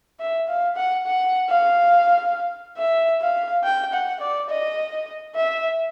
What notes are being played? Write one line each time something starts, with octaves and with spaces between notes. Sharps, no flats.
E5
F5
F#5
F#5
F5
E5
F5
G5
F#5
D5
D#5
E5